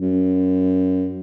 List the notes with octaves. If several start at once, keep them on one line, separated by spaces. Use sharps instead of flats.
F#2